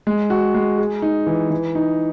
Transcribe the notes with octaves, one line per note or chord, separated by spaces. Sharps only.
G#3
F#4
G#3
G#4
D#4
E3
E3
D#4